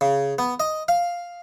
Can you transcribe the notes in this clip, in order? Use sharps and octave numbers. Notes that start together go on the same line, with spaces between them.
C#3
B3
D#5
F5